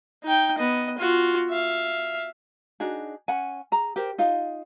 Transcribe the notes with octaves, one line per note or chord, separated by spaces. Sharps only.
D#4 G5
B3 D#5
F4 F#4
E5 F5
D4 D#4 F#4 G#4
C#4 F#5 G#5
G#4 A#5
G4 A#4 C5
D#4 F4 F5